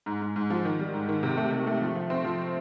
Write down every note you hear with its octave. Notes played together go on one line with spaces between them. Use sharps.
G#2
G#2
G#2
F3
D#3
G3
G#2
D#3
C3
A3
C3
A3
F3
F3
C4
F3